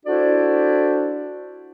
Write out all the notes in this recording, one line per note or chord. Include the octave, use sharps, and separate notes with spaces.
D4 E4 F#4 A4 C5 D5